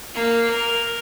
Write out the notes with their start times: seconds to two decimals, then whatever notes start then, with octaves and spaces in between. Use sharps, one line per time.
0.14 A#3
0.51 A#4